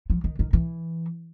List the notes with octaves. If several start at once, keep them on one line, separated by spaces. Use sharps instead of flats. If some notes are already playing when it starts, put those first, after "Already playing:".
F3
D#3
D#3
E3